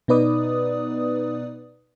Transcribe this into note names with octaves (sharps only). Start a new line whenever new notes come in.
B2 B3 D#4 B4 D5 D#6